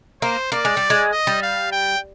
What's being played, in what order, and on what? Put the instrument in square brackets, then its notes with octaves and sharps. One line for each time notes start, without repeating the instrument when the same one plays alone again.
[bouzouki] A#3 [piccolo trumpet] C5
[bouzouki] A#3 [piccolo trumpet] D5
[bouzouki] G#3
G3
G#3
[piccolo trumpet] D#5
[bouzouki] G3
[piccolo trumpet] F5
G5